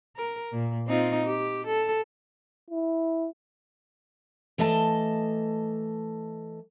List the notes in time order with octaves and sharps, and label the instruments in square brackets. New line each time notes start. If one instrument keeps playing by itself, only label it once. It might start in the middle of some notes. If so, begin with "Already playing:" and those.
[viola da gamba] A#4
A#2
C4 D#4 F4
G4
A4
[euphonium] E4
[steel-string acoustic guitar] E3 A3 D#5 E5 A5